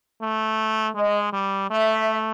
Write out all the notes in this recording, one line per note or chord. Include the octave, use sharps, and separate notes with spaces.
A3
G#3 D#5
G3
A3 E5